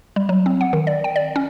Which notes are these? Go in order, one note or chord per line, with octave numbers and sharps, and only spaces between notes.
G3
F#3
C4
F#5
D#3
D5
G5
D5
C#4